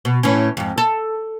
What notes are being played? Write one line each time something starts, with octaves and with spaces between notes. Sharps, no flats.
B2
A2 E3 C#4
F2 G#2
A4